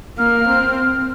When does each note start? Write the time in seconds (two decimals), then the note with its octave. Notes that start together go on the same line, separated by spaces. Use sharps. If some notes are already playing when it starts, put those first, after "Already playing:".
0.18 A#3 F6
0.48 C4